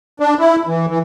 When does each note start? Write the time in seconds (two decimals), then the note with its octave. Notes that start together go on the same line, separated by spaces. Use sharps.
0.20 D4
0.39 E4
0.67 E3
0.89 E3